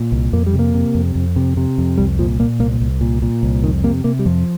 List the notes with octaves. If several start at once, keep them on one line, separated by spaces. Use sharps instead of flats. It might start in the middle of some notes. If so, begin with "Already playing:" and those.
Already playing: A#2
C2
F2 A#3
G3
C3
A#3
C3
F2
F2
C3
C3
F2
C2 G3
A#2 F3
A#2 A#3
C2 A#3
C2
A#2
A#2
C2
F2 D#3
C3 A#3
C3 A#3
G3
F2 F3